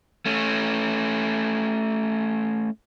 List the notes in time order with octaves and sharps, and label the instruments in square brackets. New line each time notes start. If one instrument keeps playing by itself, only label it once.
[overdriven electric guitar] A3 C#4